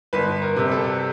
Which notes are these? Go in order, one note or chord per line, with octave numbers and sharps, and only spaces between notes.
G1 B4
A#4
C3
A4